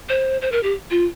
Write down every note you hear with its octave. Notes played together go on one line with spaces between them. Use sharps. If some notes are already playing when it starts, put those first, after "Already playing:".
C5
C5
A#4
G4
F4